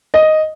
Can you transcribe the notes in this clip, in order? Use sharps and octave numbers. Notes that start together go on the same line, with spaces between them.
D#5